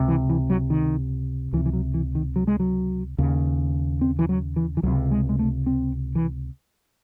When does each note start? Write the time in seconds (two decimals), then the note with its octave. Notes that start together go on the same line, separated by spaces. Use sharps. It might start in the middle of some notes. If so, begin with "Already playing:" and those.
Already playing: C#2 C3
0.08 E3
0.29 E3
0.50 F#3
0.70 D#3
1.53 C#2 E3
1.57 C3
1.66 E3
1.73 F#3
1.94 E3
2.15 D#3
2.36 F#3
2.47 G#3
2.60 F#3
3.19 D#2 C#3
4.01 C4
4.19 E3
4.29 F#3
4.56 E3
4.77 E3
4.83 C#2 F#3
4.87 C3
5.11 G#3
5.29 G#3
5.39 A3
5.66 C4
6.15 E3